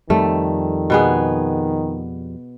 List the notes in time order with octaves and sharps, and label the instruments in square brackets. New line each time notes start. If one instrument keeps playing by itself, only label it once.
[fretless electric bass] F2 G3 [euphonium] D#3 [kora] A3
[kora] B2 B3 G#4